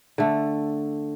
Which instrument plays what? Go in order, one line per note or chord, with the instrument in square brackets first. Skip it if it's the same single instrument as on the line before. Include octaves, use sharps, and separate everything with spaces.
[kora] D3 A3